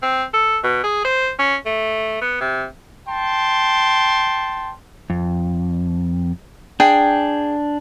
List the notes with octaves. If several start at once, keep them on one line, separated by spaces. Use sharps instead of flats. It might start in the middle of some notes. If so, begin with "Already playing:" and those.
C4
A4
B2
G#4
C5
C#4
A3
B3
C3
G5 A5 C6
F2
D4 G#4 G5 G#5